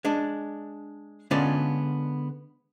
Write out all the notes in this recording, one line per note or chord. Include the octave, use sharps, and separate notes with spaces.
G#3 D4
D3 G#3 B3 C#4 F4 D5